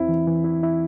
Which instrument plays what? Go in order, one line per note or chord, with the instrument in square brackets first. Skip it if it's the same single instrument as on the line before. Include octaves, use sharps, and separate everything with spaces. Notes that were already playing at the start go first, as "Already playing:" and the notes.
Already playing: [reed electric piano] E2 C4 [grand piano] E4
[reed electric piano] E3
E3
E4
E4